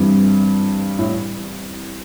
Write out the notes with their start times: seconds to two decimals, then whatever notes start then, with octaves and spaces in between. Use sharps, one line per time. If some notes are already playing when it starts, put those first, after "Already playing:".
Already playing: G2 E3 G3 C4 E4
0.99 A2